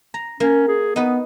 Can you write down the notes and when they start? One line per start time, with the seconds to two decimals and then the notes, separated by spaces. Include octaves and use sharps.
0.14 A#5
0.40 A#3 C#4 A#4
0.68 G#4
0.96 B3 D#4 B4